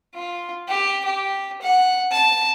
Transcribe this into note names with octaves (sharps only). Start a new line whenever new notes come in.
F4
G4
G4
F#5
A5